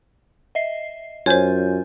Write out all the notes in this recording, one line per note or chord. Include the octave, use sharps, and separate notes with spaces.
D#5 E5 C7
F#2 F4 C5 C#5 G#5 G6